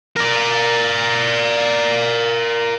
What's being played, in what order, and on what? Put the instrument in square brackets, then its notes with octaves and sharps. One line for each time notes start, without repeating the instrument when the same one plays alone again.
[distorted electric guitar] A#4 D5